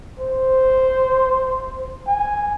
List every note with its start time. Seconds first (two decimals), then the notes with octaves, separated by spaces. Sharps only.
0.19 C5
2.08 G#5